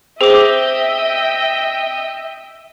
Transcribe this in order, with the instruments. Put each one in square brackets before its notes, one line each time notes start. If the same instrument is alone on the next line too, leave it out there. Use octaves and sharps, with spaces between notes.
[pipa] C4 [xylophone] G#4 D6 [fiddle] D#5 G5 [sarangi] E5